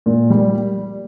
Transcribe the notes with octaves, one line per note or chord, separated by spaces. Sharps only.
A#2
G3